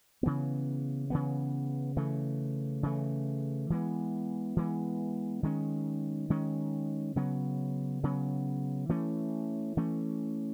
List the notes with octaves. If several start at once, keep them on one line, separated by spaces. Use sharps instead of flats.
C#3 E3 B3
C#3 E3 B3
C#3 E3 A3
C#3 E3 A3
E3 G#3 B3
E3 G#3 B3
D#3 G#3 C#4
D#3 G#3 C#4
C#3 F#3 B3
C#3 F#3 B3
E3 A3 C#4
E3 A3 C#4